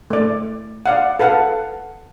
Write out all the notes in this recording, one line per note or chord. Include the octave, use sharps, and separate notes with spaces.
A3 D5
D5 F5 F#5
A4 B4 F5 F#5